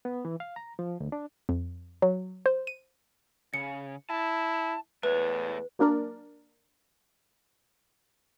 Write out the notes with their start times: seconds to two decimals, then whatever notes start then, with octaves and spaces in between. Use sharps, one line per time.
0.05 B3
0.25 E3
0.40 F5
0.56 A#5
0.79 F3
1.00 D2
1.12 D4
1.49 F2
2.02 F#3
2.46 C5
2.67 D#7
3.54 C#3 C#7
4.10 E4 A5
5.03 E2 A3 B4 C#5
5.79 F#3 A#3 D4 A#4 D5